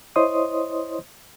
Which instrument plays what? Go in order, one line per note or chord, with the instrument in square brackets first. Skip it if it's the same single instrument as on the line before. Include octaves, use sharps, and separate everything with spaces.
[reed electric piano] E4 C5 C#5 D#5 C6 D#6